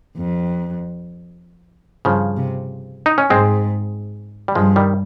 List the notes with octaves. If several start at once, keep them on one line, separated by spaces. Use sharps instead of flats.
F2
G2 C#3 F3
C3
D#4
C#4
G#2 G#3 C4
G3
G2 F3 G#3
D#3 G3